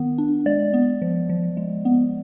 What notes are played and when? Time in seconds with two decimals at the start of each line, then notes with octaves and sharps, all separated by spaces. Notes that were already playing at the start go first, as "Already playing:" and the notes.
Already playing: D#3 B3
0.18 D4
0.46 G#3 D5
0.74 B3
1.02 F3
1.29 F3
1.57 G#3
1.85 B3